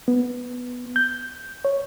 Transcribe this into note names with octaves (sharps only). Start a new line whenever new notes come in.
B3
G6
C#5